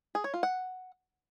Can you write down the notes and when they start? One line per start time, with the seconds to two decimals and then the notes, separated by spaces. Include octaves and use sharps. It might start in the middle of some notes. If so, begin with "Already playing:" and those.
0.15 G#4
0.24 C#5
0.34 F4
0.43 F#5